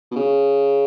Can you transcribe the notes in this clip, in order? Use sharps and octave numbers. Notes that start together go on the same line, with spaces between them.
B2
C#3